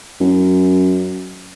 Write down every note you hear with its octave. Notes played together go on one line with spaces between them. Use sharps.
F#2